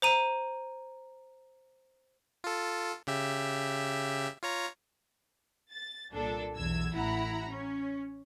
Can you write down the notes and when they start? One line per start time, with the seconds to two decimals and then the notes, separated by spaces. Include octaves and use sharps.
0.02 C5 A#5 D#7
2.44 F4 A4
3.07 C#3 G4 E5
4.43 F4 C#5 A#5
5.72 A6
6.13 C2 A#2 D4 A4
6.57 B1 E2 E6 G#6
6.94 A1 E4 F#5 A#5 B5
7.50 C#4